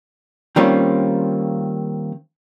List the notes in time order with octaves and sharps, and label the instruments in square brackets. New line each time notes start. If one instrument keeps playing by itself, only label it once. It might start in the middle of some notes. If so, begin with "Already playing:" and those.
[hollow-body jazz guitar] D#3 G3 A#3 C4 C#4 F4